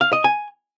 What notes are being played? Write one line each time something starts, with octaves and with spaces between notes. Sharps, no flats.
F5
D#5
G#5